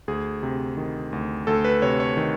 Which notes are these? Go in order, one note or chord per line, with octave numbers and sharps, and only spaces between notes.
D2 G#4
C3
D#3
D2
D2 A4
B4
C3 C#5
C#5
D#3